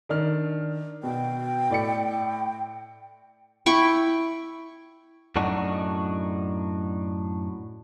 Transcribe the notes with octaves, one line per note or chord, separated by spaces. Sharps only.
D#3 D4 F6
B2 G5
A2 D5 C#7
E4 G5 B5 C#6
F#2 A2 D4 D#4 F#4